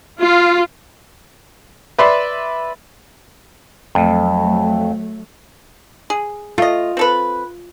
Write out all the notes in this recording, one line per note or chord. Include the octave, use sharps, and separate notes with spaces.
F4
B4 D5 E5 B5 C6
F2 F#3 A3
G#4
A3 F4 D#5
C4 A4 B4